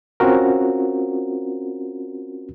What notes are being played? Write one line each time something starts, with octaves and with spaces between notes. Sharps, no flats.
C4 C#4 F4 F#4 A#4